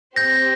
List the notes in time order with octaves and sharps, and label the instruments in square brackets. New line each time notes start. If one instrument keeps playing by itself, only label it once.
[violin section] C4 G4 C5 [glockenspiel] G6 A#6